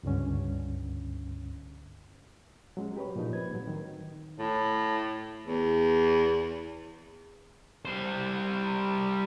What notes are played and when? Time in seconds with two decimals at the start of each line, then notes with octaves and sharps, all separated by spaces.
0.03 C#2 G2 D3 C#4
2.77 F#3 G#3 C#4
2.97 G4 B4 C#5
3.16 A#2 F3 D#4
3.33 C4 B4 G#6
3.53 A2 F#3
3.67 D#3
4.39 A2
5.46 E2
7.85 G3 C5